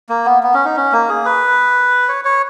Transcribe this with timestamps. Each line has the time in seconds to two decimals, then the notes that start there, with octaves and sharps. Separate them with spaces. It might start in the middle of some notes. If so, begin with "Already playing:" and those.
0.09 A#3
0.26 B3
0.43 B3
0.54 C#4
0.65 D#4
0.76 C#4
0.92 A#3
1.09 G#4
1.25 B4
2.08 C#5
2.25 C#5